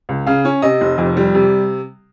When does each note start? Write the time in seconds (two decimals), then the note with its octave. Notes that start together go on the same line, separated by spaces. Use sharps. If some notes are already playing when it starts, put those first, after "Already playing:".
0.09 C#2
0.27 C#3 F5
0.45 C#4
0.62 C3 D#5
0.81 F1
0.98 F2
1.17 G3
1.35 C3